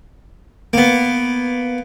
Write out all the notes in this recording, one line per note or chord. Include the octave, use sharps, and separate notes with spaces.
A#3 B3